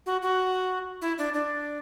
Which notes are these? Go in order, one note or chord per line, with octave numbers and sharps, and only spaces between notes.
F#4
F#4
E4
D4
D4